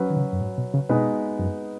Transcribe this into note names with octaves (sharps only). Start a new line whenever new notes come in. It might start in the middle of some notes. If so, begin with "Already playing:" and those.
Already playing: F#3 C#4 B4
D#3
C#3
F#2
G#2
B2
C#3
B2 G#3 B3 D#4 B4
F#2